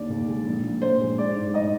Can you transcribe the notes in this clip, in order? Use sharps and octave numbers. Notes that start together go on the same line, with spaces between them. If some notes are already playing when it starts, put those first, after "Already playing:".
Already playing: D#2 D3 D5
D#2
G#3
A#1
A#2
A#1 C5
G#3
G#3 D5
G#2
D#5